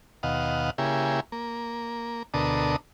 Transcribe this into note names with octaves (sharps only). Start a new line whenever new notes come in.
D#2 B2 D#5 F5 F#5
C#3 A#3 E4 G4 G#4
A#3
D2 B2 D4 A4 A#4 D#6